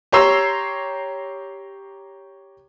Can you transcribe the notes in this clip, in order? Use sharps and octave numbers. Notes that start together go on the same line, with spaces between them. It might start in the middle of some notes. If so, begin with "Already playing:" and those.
G4 C#5 A#5 C6 E6